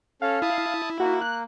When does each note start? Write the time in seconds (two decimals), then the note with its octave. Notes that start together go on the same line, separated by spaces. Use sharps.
0.22 C#4 A4 F5
0.42 E4 A5 D#6
1.00 A#3 F#4
1.21 F#6